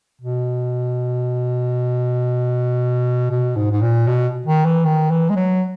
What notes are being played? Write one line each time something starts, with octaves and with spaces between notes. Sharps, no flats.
B2
B2
G#2
G#2
A#2
B2
D#3
E3
D#3
E3
G#3
F#3